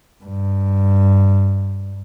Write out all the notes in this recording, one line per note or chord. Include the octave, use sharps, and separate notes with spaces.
G2